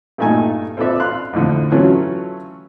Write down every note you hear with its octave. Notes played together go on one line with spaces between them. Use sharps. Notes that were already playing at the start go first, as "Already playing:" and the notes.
G2 A#2 A3 D#4 G#5
C4 F4 A4 B4 D5 E5
F5 C6 F#6
F2 A2 D3
E3 F#3 A3 C#4 F4